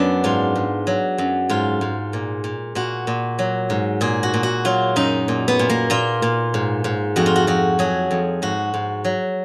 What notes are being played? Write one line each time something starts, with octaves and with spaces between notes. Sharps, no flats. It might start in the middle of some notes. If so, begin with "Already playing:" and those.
Already playing: F#2 F#3 B3 D4
G#2 F4
G#2
F#3
F#2
G#2 F4
G#2
A#2
A#2
A#2 F#4
A#2
F#3
G#2
A#2 G#4
F#4
A#2
F#4
F#3 F4
F#2 D#4
A#2
B3
A#2
A#3
A#2 F4
A#2
G#2
G#2
F2 F#4
F4
F#4
F2 F#4
F#3 G#4
F2
G#2 F#4
G#2
F#3